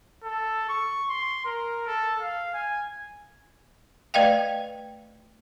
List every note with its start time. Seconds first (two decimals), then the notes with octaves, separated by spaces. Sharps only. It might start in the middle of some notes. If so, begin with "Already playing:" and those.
0.24 A4
0.69 C#6
1.09 C6
1.46 A#4
1.87 A4
2.21 F5
2.53 G#5
4.14 A3 B4 D5 D#5 F5 G5